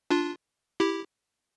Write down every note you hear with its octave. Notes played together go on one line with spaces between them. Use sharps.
D4 F4
E4 G4